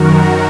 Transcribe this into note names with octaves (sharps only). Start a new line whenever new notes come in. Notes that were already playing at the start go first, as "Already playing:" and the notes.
Already playing: F#2 D#3 F#4 A#4